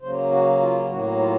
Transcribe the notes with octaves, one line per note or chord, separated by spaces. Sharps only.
C#3 F#3 A#3 C5
F#4
F4
A2 F#3 A#3 F#4
F4